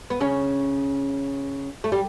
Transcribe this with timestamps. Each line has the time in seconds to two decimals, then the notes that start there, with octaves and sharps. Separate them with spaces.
0.10 B3
0.20 C#3 C#4
1.84 A3
1.92 G3